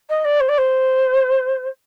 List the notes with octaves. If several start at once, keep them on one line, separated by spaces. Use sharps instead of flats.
D#5
D5
C5
D5
C5